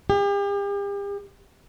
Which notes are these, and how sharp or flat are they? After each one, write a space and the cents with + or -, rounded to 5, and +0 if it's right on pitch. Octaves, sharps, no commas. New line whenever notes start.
G4 +40